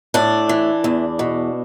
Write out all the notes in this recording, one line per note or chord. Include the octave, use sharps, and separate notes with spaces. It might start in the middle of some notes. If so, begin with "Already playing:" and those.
A2 D4
E3
E2
B2